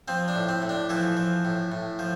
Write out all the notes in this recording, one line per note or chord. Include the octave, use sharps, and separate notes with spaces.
F3 C4
D4
A2
C4
A2
D4
E3 F3 E4
F3
A2
A2
F3